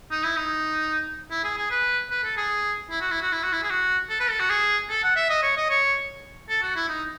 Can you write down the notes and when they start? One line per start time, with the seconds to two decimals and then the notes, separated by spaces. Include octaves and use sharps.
0.11 D#4
0.24 E4
0.37 D#4
1.31 E4
1.44 G#4
1.57 G#4
1.70 B4
2.10 B4
2.24 A4
2.37 G#4
2.90 E4
3.01 F#4
3.11 E4
3.22 F#4
3.32 E4
3.43 F#4
3.53 E4
3.63 G#4
3.70 F#4
4.10 A4
4.20 B4
4.30 A4
4.40 F#4
4.50 G#4
4.89 A4
5.03 F#5
5.16 E5
5.29 D#5
5.43 C#5
5.56 D#5
5.70 C#5
6.49 A4
6.62 F#4
6.76 E4
6.89 D#4